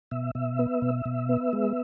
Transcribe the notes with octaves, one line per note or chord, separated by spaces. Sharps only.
B2 E5
B2 E5
B3
B2
B2
B3
G#3